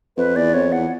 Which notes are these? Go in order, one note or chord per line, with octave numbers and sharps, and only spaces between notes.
F2 B4
E2 D5
F2 C#5
E2 F#5